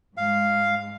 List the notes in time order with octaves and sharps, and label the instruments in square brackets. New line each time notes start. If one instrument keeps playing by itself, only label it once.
[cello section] G#2 G#3 [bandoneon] F5